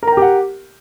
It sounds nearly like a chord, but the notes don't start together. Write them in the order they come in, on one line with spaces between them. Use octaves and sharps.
A#4 A#5 G5 G4 F#5